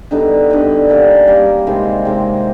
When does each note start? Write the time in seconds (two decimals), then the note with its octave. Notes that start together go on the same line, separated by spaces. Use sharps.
0.11 D3 G3 B3 D#4
0.50 D3 G3 B3 D#4
0.89 G3 A#3 C#4
1.28 G3 A#3 C#4
1.66 C3 D#3 G#3 C4
2.05 C3 D#3 G#3 C4